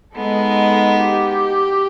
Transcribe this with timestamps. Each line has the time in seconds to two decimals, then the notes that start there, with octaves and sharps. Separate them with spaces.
0.15 G#3 B3 D#4 A4
0.97 G4